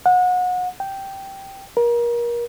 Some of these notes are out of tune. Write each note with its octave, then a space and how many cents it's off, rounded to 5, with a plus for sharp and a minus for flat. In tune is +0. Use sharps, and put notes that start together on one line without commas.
F#5 -30
G5 -10
A#4 +30